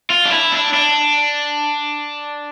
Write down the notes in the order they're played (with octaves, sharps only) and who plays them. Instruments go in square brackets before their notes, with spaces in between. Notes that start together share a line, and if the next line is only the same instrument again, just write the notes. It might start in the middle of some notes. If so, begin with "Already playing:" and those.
[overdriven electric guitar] F4
D4
E4
D4
D4